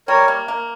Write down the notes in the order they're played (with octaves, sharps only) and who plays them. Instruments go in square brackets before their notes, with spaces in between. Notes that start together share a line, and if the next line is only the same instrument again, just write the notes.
[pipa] G3 [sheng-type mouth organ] A#4 C#5
[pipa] A#3
A#3